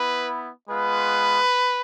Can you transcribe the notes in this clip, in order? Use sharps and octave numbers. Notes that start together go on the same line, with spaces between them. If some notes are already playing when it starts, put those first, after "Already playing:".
Already playing: B3 E4 B4
G#3 B3 F4 B4